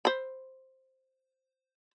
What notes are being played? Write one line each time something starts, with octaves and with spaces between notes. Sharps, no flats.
C5 B5